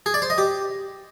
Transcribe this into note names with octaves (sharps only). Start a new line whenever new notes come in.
G#4
D5
C5
D#5
G4